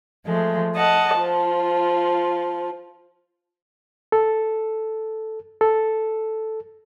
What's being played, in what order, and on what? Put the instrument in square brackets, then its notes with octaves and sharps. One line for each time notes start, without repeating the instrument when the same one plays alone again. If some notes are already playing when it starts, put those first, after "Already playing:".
[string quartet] F3 G#3 A3
D#5 F#5 A5
F3 F4
[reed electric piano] A4
A4